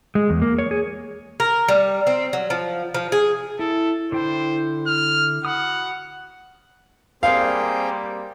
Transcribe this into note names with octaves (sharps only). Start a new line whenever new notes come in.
G#3
E2
A#3
C#5
G#4
A#4
G3
C4
F#3
F3
F3
G#4
E4 A4
D3 E4 C5 G5
F6
F#4 F#5 B5 D#6
G3 A#3 C4 G#4 F5 G5